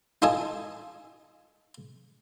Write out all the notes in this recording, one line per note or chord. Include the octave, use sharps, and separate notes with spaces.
D#4 F4 A4 D#5 G#5